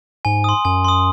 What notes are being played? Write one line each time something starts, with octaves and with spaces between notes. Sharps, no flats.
G#2 G#5
C6 D#6
F#2 G#5
C6 D#6